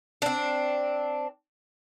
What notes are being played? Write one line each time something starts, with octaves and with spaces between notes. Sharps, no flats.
C4 D4